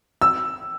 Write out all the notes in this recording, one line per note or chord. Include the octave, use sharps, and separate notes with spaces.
E6